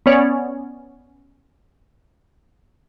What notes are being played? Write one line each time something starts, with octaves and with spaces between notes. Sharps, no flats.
B3 C#4 C#5 D5